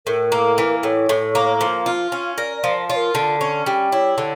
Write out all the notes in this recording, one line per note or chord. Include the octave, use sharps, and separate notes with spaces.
A2 A#4
A#3
E3
A2 C#5
A2
A#3
F3 F5
F4
C#4
A#4 D5
D5
F3
F4 C#5
A#4
D3
C#4
G3
E4 C#5
D3